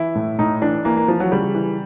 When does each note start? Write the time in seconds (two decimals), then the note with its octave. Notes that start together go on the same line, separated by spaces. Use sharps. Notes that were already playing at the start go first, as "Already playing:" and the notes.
Already playing: E3 E4
0.15 A2
0.39 A2 D#4
0.62 E3 D4
0.85 E3 A#3
0.97 A#3
1.08 E3 F3
1.20 F#3
1.32 C#3 G3
1.55 E3